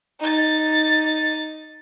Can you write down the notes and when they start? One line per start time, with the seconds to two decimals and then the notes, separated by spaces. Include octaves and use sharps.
0.20 D#4 A6